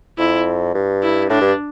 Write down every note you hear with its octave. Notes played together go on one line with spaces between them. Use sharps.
F2 E4
G2
E4
A2 D4
G2